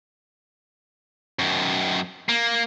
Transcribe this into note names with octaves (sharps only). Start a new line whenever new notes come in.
F#2 D#3
A#3